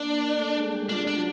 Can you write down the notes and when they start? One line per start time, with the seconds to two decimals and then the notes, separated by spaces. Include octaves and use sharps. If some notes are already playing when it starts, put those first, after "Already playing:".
Already playing: A#3 D4 A#4
0.37 A3 A4
0.54 G#3 G#4
0.72 G3 G4
0.89 D4 F4
1.07 D4 G4
1.15 F#3 F#4